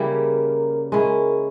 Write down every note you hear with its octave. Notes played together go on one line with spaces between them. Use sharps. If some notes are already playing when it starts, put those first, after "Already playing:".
Already playing: C#3 G3 A#3 E4 A#4
G#3 C#4 E4 A#4